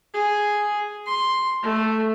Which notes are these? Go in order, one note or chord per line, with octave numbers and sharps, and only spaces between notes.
G#4
C6
A3